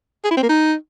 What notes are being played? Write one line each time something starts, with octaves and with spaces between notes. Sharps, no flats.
G#4
E4
C4
A#3
D#4